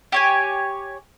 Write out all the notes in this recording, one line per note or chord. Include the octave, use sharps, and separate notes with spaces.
G4 C#5 G#5